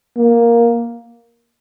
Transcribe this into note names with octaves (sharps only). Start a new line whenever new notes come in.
A#3